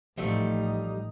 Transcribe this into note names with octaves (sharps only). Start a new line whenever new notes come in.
A1 F3 G3 A3 D#4